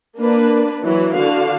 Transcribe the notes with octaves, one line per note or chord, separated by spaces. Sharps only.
A#3 D4 B4
E3 F#3
D3 F#4 F5